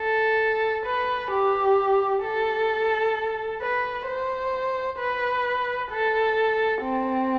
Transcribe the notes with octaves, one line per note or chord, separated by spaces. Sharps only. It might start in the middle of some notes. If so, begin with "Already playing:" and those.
Already playing: A4
B4
G4
A4
B4
C5
B4
A4
C4